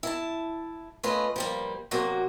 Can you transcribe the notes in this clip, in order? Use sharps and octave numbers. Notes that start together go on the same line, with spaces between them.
E4 A5
A3 C#4 F4 B4 D#5
F3 G3 A#3
C3 F#3 A#3 F#4